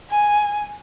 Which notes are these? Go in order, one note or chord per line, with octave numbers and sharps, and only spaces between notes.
G#5